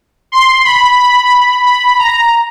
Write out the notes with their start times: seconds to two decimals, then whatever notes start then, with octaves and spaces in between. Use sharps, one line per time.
0.32 C6
0.64 B5
0.98 B5
1.66 B5
1.99 A#5